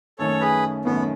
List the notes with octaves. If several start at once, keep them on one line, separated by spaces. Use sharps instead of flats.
F#2 D#3 A3 C#4 A4 C#5
G#4 B4
F#2 D#3 A3 B3 C#4